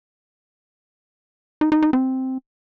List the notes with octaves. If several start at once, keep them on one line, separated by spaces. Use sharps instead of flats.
D#4
D#4
D#4
C4